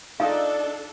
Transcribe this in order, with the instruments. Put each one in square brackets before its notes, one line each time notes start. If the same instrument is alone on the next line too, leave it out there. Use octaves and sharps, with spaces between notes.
[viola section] D4 A4 [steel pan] D#4 F4 D#5 [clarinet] D5 [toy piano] F5